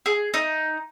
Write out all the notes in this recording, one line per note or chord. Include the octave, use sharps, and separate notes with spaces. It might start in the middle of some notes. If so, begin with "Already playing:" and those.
G#4
D#4